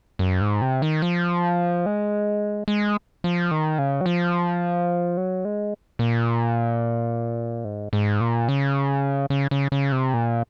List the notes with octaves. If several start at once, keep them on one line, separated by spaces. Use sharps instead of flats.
F#2
G#2
C3
D#3
F3
G#3
G#3
F3
D#3
C#3
F#3
F3
F#3
G#3
A#2
G#2
G#2
A#2
C#3
C#3
C#3
C#3
C3
A#2